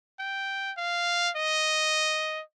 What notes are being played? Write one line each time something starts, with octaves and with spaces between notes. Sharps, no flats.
G5
F5
D#5